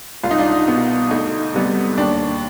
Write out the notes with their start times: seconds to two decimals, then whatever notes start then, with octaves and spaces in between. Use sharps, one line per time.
0.23 C2 F4
0.31 D#4
0.38 D4 F4
0.68 B2 B3
1.11 D2 D#4
1.54 C3 G3 B3
1.98 D#2 D4